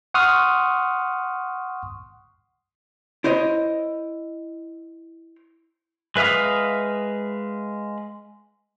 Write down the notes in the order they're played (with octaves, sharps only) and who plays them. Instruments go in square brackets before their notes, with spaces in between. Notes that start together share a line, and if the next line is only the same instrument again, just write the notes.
[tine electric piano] F#5 C6 C#6 D#6 F6
[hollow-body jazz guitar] E4 C5 C#5 D#5
[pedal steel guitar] G#3 B4 E5 F5 D#6